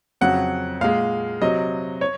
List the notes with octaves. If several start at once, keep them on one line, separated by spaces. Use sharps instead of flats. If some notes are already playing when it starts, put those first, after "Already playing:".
F2 C#3 F#3 F#5
A#2 G#3 F5
C3 F#3 D#5
C#5